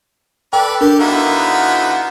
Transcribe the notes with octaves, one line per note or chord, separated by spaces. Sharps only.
A4 B4 D5 G5
D4 G4 A#4
D3 B3 D#4 E4 F#4 F5